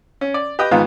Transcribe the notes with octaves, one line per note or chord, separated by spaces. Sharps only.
C#4
D5
G4 B4 D#5 G5
G#2 D#3 B3 F4